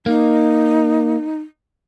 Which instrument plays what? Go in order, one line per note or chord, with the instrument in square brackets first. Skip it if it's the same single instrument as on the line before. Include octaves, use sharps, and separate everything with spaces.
[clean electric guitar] A#3 [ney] D#4